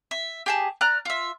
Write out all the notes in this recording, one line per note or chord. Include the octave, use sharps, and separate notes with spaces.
E5
G4 G#4 A5
D5 A#5 F6 F#6
F4 E5